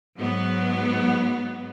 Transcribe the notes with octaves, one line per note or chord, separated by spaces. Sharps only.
G#2 F#3 B3